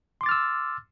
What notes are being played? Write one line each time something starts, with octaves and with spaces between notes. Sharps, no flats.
C6 D6 E6 F6 A6